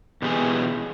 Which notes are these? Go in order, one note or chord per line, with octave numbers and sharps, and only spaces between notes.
B2 E3 G4 G#4 G#5